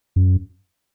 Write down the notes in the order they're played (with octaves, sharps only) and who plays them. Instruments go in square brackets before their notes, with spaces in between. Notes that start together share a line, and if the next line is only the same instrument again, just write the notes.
[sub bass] F#2